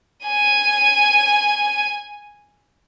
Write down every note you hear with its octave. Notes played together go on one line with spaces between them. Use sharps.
G#5 D#7